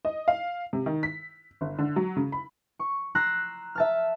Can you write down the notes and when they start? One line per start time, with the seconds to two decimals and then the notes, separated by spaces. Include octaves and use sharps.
0.05 D#5
0.28 F5
0.73 C3
0.86 D#3
1.03 B6
1.61 G1
1.79 D3
1.96 F#3
2.16 C#3
2.32 B5
2.79 C#6
3.15 A#5 C6 E6 F#6
3.75 E5 A5 F6